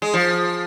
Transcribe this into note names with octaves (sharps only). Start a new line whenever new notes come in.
G#3
F3